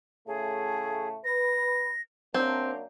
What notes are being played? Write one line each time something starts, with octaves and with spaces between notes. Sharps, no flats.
A2 C#3 A3 G#4
B4 A#6
F#2 A#3 C4 D4 A#5